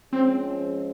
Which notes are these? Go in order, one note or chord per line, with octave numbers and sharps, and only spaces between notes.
F3 G#3 C4 C#4